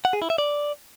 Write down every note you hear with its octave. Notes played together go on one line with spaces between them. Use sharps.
F#5
G#4
E4
E5
D5